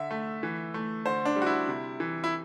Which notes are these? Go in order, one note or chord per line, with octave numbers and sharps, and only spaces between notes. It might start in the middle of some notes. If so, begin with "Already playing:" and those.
Already playing: D3 E5
A3
E3
A3
D3 C5
D4
G3
F#4
E4
C3
E3
E4